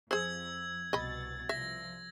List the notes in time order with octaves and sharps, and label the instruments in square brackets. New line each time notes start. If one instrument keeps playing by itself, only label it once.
[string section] F2 [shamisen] G#4 C5 [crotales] E6 G#6
[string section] C2 B2 A6 [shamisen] D#5 B5
[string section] C2 F3 [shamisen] E5 [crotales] A#6